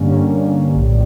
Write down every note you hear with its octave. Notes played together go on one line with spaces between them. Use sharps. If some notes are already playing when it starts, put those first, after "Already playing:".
Already playing: G2 D3 G3 A#3 C#4
A#1 A2 G3